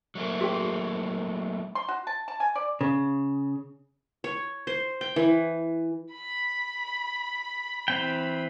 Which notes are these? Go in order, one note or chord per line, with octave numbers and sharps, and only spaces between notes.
F#3 A3 A#3
F#4 G#4 G5
C6
F#4
A5
A5
G#5
D5
C#3
C#5
C5
G5
E3
B5
E3 C4 G5